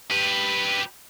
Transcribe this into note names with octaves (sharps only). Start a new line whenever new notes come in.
G4 B4